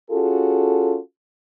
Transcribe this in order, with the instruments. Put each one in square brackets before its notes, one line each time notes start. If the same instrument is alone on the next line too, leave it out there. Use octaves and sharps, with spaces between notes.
[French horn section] C#4 F4 F#4 G#4 A4